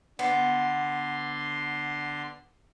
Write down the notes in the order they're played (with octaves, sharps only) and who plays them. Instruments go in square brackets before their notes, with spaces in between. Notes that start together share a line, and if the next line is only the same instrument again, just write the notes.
[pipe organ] D3 C6 [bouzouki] B3